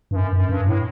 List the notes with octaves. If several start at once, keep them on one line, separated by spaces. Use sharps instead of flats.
G2
F#2
F#2
G2
A2